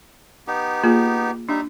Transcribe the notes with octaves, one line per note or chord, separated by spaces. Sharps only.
B3 D#4 G4
A#3 F4 G#4
G3 D4 D#4 E5